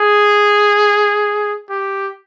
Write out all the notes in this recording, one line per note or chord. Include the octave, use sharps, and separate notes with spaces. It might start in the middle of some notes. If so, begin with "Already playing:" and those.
Already playing: G#4
G4